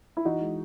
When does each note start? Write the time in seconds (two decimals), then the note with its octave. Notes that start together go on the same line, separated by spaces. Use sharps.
0.17 E4
0.25 E3 D#4 F#4
0.41 G#3